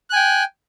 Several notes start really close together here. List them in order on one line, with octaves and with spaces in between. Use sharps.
F#6 G#5 G5